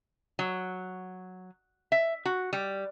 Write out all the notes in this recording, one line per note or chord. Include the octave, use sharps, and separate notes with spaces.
F#3
E5
F#4
G3